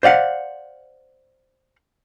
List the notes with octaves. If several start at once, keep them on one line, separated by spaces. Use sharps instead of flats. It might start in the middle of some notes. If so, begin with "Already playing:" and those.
C5 D5 F5 F#5